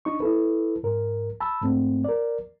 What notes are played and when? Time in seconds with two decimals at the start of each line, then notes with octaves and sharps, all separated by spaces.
0.05 D4 D#4 C#6
0.20 E4 A4 B4
0.83 G#2 A#4
1.40 A5 B5 E6
1.62 G#2 A3 C4
2.04 A#4 D5